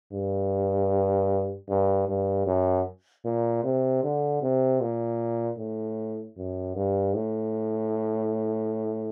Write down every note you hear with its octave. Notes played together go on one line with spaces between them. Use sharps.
G2
G2
G2
F#2
A#2
C3
D3
C3
A#2
A2
F#2
G2
A2